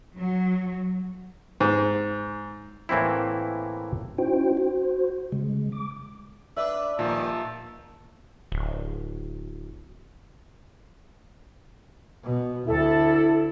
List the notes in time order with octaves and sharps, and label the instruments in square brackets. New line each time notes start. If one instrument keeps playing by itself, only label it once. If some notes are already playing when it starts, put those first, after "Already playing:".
[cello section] F#3
[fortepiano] G#2
[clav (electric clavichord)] A2 E3 A#3 C4 E4
[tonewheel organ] C#4 D#4 E4 F#4 C5 G5
F#4 C5
C#3 G#3
D6
[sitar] D4 B4 D5 [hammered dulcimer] E5
[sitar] G2 D#3 F3 [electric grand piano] A#2 [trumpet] A5
[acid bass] D1
[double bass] B2
[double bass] D2 [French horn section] E4 [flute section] A4